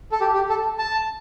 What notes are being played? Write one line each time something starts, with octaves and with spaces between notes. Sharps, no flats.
A4
G4
G4
A4
A5